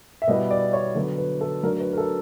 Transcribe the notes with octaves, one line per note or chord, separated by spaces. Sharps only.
E5
B2 G3 B3 E4 D#5
D5
C#5
D3 F#3 B3
B4
A4
F#3 A3 D4 A#4
B4
A#4
A4